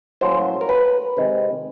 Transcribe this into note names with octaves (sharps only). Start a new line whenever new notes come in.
A2 F#3 A#3 C#4 C5
A#4
B4
C3 D#3 G#3 C4